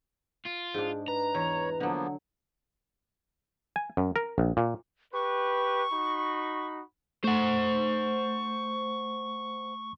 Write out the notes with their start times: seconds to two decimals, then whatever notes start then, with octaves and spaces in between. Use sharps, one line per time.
0.46 F4
0.74 G#2 D4 G#4
1.08 B4 A#5
1.35 E2 C#5
1.80 D3 F3 F#3 A#3 B3
3.76 G#5
3.97 F#2
4.16 A#4
4.38 A#1
4.57 A#2
5.14 G4 B4 C#6
5.92 D#4 F#4 B5
7.24 A3 C5 F#5 C#6